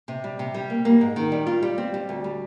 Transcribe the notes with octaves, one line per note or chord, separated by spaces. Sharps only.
C3
G3
C3
G3
A#3
A#3
G#2
D#3
G3
F4
G3
C4
G3
D2
G3